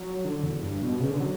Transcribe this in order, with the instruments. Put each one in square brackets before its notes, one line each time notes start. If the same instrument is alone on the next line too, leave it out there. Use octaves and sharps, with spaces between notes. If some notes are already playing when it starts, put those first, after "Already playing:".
Already playing: [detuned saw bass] F#3
D3
E2
G2
B2
C#3
D3
F#3